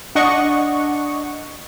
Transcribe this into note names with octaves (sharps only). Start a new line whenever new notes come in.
D4 D#5 F#5 C#6